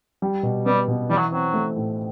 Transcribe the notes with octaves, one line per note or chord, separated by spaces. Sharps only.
G3
B2
G3 B3
B2
E3 G3
F#3
F#3 C4
A3
A2